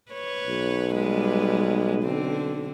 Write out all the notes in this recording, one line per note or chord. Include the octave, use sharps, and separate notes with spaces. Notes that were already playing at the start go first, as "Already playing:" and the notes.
B4 C#5
B1
G3 G#3 B4
D3 C4